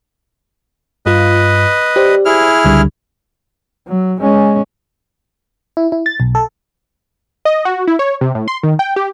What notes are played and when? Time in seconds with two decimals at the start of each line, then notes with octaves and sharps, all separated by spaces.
1.06 G2 F4 B4 D#5
1.96 G4 C5 D5
2.25 E4 G#4 F6
2.65 C#2 D3 G3
3.88 F#3
4.21 G#3 C#4
5.77 E4
5.92 E4
6.06 A6
6.20 B1
6.35 A4
7.45 D#5
7.65 F#4
7.87 E4
7.99 C#5
8.21 C3
8.35 A2
8.48 C6
8.63 D#3
8.79 G5
8.96 G4